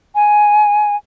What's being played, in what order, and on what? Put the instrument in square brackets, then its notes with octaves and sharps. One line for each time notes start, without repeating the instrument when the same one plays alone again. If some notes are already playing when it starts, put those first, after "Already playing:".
[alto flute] G#5